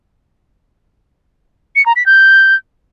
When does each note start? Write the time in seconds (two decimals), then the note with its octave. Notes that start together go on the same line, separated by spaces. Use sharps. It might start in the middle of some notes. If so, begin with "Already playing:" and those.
1.76 C#7
1.86 A#5
1.96 B6
2.06 G6